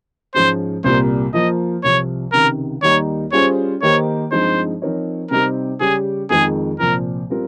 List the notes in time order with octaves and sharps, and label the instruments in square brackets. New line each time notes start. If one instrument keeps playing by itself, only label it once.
[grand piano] G#2 F3 G#3 C#4 [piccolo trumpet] C5
[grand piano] C2 A#2 G3 A#3 [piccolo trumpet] C5
[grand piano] F3 A#3 F4 [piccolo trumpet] D#5
[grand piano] C2 C3 F3 [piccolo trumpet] C#5
[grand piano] C#2 C3 D#3 [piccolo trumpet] A#4
[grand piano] D#2 D#3 G3 A#3 D#4 [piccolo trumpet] C#5
[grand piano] G3 C#4 F4 G#4 C5 [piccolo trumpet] C#5
[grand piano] D#3 A#3 D#4 G4 C5 [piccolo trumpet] C#5
[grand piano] G2 F3 G#3 C4 D#4 [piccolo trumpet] C5
[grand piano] F3 C4 D#4 A#4 C#5
[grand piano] C3 G3 C4 D#4 G4 [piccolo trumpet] A#4
[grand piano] C#3 G3 C#4 G4 [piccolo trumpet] G#4
[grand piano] F2 D#3 G#3 [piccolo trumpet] G#4
[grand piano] C2 A#2 F3 [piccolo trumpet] A#4
[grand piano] G3 C4 F4 A#4